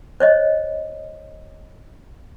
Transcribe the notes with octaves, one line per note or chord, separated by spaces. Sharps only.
C5 C#5 D#5